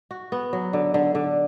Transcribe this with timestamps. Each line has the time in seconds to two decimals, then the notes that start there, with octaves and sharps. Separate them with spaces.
0.11 F#4
0.32 B3
0.53 F#3
0.73 D3
0.94 D3
1.15 D3